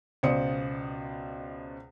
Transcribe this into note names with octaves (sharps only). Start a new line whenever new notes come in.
C#2 B2 C5 D5 D#6 C#7